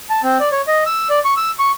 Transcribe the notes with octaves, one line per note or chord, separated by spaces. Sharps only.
A5
C4
D5
C#5
D#5
E6
D5
C#6
E6
C#6